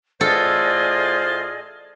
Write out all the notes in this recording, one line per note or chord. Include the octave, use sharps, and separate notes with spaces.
A2 F4 G#4 A4 C5 D5 D#5